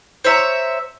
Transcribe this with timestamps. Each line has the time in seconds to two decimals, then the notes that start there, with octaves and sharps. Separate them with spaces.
0.24 C5 C#5 E5 A#5